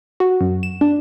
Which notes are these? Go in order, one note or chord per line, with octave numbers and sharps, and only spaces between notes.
F#4
F#2
E7
D4